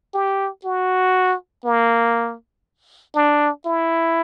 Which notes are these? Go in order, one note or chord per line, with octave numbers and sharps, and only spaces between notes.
G4
F#4
A#3
D4
E4